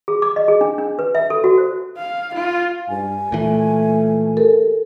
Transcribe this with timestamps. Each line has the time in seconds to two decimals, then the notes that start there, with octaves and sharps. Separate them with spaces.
0.08 G#4
0.22 D6
0.36 D#5
0.48 G#4
0.61 D4
0.78 D4
0.99 B4
1.15 E5
1.30 A4
1.44 F#4
1.58 C5
1.97 F5
2.36 F4
2.89 G2 G#5
3.32 A#2 E3 A3
4.37 G4 A4 A#4